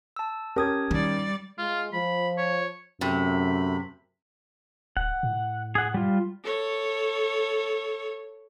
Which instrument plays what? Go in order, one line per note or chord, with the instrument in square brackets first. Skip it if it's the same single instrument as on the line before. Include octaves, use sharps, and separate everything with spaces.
[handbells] A5 E6
[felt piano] C#4 G4 A#4 [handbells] A5 D#6 G#6
[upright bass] D#3 [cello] G3 D5
[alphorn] G#3 [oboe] F4
[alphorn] F3 [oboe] B5
[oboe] C#5
[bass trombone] F#2 [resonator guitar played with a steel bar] C3 [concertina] A3 B5
[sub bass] D1 [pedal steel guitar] F#5
[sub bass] A2
[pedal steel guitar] G#4 F#5
G3 F4
[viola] A4 C#5